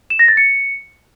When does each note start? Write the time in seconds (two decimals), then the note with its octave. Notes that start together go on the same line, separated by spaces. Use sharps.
0.10 E7
0.19 A#6
0.28 A6
0.37 C#7